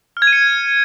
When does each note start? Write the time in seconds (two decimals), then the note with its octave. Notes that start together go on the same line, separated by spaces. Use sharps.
0.17 F6
0.22 G#6
0.27 D#7
0.33 C#7